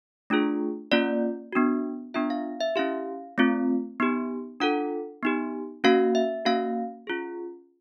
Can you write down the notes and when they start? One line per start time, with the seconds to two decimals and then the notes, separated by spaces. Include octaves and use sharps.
0.30 A3 D4 F4 G#4
0.92 A#3 C#4 F4 D5
1.53 B3 D4 F#4
2.14 B3 D4 F4 E5
2.30 F5
2.61 E5
2.76 C#4 E4 G4 F5
3.38 A3 C4 F4
4.00 B3 D#4 G4
4.60 D4 F4 A4 F#5
5.23 B3 D#4 G4
5.84 A#3 C#4 F#4 F5
6.15 E5
6.45 A#3 C#4 F#4 F5
7.07 C#4 F4 G#4